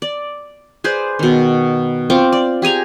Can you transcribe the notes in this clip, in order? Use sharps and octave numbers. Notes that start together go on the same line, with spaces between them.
D5
G#4 B4 C5 D5
B2 D#3
C4 F4 C#6 D6
D5
G4 G#4 G#5 A#5